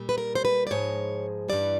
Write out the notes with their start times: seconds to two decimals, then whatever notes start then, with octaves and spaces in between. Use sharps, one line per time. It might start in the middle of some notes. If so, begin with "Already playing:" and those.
Already playing: A#2 G3
0.09 B4
0.18 A#4
0.35 C5
0.45 B4
0.67 D5
0.71 G#2 F3 G#3 C#5
1.48 G2 E3 G3 D5